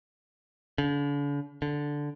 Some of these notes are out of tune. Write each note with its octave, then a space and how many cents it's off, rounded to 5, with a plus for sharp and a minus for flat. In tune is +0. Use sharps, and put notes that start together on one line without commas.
D3 -45
D3 -5